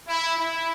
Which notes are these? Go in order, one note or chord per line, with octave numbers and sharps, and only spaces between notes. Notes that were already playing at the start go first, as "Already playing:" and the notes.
E4
E4